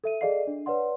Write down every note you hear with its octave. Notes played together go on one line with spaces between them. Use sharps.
A4 E5 D#7
G#4 A4 D5 D#5 F5 C7
D4
B4 C#5 D5 F#5 C6